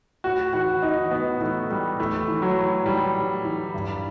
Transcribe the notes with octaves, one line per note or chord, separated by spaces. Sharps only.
A2 F#4
E3 F#4
E3 D#4
A2 B3
E3 A3
A2 G3
E3 A3
E3
F#3
A2
E3 G3
A2
E3
G2